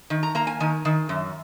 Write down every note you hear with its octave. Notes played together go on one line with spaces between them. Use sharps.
D#3
A#5
A#3 A#5
G#5
D#3 G#5
D#3
F#2